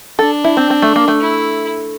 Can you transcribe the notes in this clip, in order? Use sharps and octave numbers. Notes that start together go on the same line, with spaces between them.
D4 A4
E4
C4
C4
A3
A#3
A3
E4